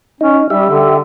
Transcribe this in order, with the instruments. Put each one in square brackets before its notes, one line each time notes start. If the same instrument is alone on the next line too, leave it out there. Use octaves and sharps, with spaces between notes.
[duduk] C#4 [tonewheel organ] D#4
[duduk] G3 [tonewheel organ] G4 E5
[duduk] D3